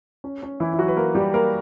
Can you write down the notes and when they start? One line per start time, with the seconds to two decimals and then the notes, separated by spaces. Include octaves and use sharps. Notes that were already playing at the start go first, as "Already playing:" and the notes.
0.24 C#4
0.43 C#4
0.60 E3 E4
0.73 E4
0.79 F#3 F#4
0.88 B4
0.97 A#3 A#4
1.15 G3 G4
1.34 A#3 A#4